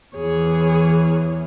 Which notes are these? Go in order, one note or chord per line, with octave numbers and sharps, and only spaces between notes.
E2 E3 G#4 C#5